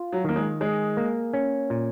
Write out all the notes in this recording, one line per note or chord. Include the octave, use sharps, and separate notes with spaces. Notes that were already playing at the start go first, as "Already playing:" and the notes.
Already playing: F4
F#3
D#3 A#3
G#3
G#3 G#4
A#3
C#4
A#2